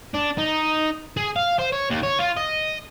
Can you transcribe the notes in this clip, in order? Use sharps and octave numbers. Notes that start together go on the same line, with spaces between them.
D4
D#4
G#4
F5
C5
C#5
D#2
C#5
F4
D#5